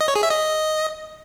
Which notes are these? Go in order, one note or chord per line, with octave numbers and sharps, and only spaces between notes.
D#5
C#5
G#4
E5
D#5